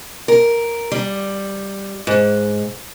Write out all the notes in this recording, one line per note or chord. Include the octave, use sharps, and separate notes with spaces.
A#4
G3
G#2